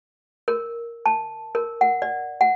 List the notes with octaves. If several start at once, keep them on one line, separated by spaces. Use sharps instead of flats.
A#4
A5
A#4
F#5
D5
F#5